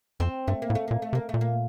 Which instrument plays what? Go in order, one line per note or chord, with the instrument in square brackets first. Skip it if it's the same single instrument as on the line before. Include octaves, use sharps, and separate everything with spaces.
[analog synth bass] F2 [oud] C4
[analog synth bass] G2 [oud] A3
[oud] A#3
[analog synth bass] A2
[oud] A3
[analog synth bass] A#2 [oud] A#3
[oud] A3
[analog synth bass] C3 [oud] A#3
[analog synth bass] A#2 [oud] A3
[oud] A#3